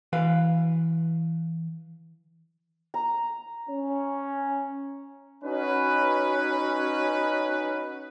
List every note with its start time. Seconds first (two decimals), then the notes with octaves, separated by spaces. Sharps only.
0.13 E3 B4 F5
2.94 A#5
3.69 C#4
5.43 C#4 D#4 F#4 B4